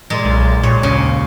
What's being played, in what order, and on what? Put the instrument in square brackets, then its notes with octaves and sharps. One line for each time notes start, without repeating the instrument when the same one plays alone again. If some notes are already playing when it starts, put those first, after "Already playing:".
[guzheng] A#2 G#3
[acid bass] B1
[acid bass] A#2 [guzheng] C#5
[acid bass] D#2 [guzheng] C#3